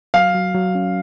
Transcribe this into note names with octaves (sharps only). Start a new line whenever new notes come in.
F#3 F5
F#3
F#3
C#4